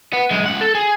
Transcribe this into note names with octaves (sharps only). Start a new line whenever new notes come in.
B3
F#2 G#3
C#2 F#5
A4
G#4